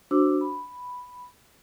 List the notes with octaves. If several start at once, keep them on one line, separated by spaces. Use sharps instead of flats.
D4 F#4 C5 D6 E6
B5